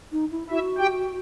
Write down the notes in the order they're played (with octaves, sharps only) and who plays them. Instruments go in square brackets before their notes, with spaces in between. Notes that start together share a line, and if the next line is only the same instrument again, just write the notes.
[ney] D#4
E4
[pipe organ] E4 E5 [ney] F#4
[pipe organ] G4 G5